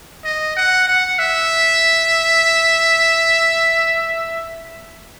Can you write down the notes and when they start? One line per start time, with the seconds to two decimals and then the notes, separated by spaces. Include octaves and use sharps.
0.24 D#5
0.56 F#5
0.88 F#5
1.19 E5